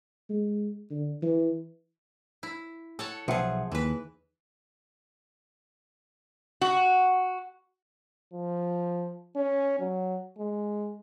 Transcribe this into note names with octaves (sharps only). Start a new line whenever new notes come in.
G#3
D3
E3
E4
A4 C#5 F#5
B1 F3 G#4 E5 F#5
D#2 E3 B4
F#4
F3
C#4
F#3
G#3